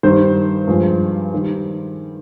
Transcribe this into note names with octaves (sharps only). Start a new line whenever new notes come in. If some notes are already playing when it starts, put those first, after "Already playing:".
G2 D#3 G3 C5
G2 F3 G#3
D#3 G3